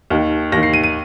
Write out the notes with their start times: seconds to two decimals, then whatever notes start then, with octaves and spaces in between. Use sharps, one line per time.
0.10 D#2 D#3
0.52 D#2 D#3 A#6
0.63 C7
0.74 D#7
0.84 D#7